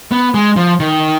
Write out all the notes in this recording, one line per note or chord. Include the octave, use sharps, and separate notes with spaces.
B3
G#3
F3
D#3